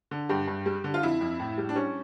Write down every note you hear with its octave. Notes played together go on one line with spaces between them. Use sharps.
D3
G2 G4
G2
G3
D3
F4
F2 E4
F2
A2
G3
D4
G3 C#4